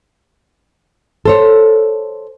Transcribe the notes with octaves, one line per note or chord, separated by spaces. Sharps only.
A4 C5 C#5